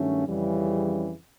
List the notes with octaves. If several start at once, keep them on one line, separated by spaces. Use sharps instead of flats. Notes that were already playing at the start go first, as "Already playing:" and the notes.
Already playing: G2 D#3 F#3 A3 C#4
F2 C#3 E3 G3